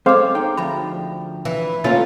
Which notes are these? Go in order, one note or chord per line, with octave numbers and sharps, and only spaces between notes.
G#3 C4 G#4 A4 C5 C#5 F5 D6
D#4 G5
D2 F3 A#5 B5
E3
D3 A3 A#3 C#4 F4 A6